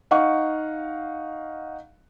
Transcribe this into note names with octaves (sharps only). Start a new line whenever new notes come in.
D#4 F5 F#5 C#6